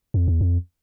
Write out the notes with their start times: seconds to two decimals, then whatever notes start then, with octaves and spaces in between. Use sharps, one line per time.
0.14 F2
0.28 E2
0.41 F2